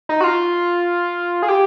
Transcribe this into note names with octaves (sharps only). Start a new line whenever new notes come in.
D#4
F#4
F4
G#4
G4